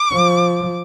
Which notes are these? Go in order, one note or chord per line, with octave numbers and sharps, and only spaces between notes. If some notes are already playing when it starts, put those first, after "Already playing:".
Already playing: D6
F3